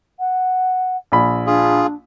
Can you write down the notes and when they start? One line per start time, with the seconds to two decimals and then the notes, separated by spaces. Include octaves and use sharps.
0.19 F#5
1.12 A#1 B5
1.47 D4 F4 G#4